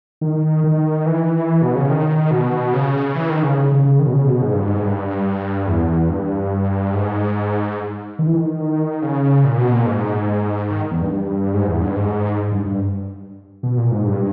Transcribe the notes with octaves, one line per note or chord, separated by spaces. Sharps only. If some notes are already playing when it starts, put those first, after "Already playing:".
D#3
D#3
E3
B2
C#3
D#3
B2
C#3
E3
D#3
C#3
C#3
C#3
C#3
D#3
B2
C#3
B2
G#2
G2
G#2
G2
E2
G2
G#2
D#3
E3
D#3
C#3
A#2
B2
A#2
G#2
D#3
E2
G2
G2
G#2
E2
G2
G#2
G2
G2
B2
A#2
G#2
G2